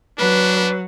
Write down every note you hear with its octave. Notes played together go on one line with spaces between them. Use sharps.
F#3 D4 B4